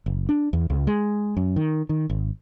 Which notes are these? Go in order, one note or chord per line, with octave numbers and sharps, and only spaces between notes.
F#1
D4
E2
C#2
G#3
F#2
D#3
D#3
G#1